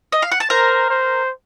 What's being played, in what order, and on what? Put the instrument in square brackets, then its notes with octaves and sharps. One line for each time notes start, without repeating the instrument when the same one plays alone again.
[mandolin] D#5
F5
F#5
A5
[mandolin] A#4 A#5 [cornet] C5
[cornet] C5